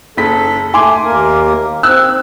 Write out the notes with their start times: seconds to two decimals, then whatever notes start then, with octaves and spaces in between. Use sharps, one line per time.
0.17 F#1 A4 B6
0.74 A3 G#5 C6 D6
1.04 D#2 A#3 A#4
1.83 C4 E6 F#6